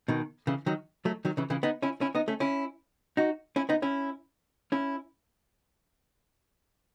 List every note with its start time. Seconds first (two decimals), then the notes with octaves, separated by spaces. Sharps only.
0.08 B2 D#3
0.47 C#3 E3
0.66 D#3 F#3
1.05 F#3 A3
1.25 D#3 F#3
1.37 C#3 E3
1.50 C#3 E3
1.63 B3 D#4
1.82 C#4 E4
2.01 C#4 E4
2.15 B3 D#4
2.28 A3 C#4
2.40 C#4 E4
3.17 D#4 F#4
3.56 C#4 E4
3.69 B3 D#4
3.82 C#4 E4
4.72 C#4 E4